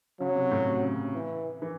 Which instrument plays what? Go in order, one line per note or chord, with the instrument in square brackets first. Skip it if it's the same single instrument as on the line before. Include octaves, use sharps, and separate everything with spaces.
[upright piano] C#3 [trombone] F#3
[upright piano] C#3
C3
A2
C3
C#3
[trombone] E3
[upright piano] E3